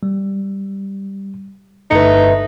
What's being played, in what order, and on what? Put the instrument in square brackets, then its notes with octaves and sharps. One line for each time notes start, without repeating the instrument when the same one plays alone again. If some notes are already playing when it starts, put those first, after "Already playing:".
[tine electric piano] G3
[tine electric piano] G1 G2 C#7 [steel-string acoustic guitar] A3 E4 B4 [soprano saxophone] D#4